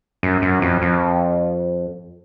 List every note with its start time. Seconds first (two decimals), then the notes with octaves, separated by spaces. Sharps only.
0.23 F#2
0.42 F#2
0.62 F2
0.82 F2